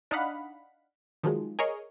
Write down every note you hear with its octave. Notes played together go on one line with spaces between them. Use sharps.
D4 D#4 D#5 F5 F#5 B5
D#3 F3 F#3 G#3
G#4 A#4 C#5 D#5